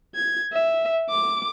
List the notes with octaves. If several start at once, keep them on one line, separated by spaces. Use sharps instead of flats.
G#6
E5
D6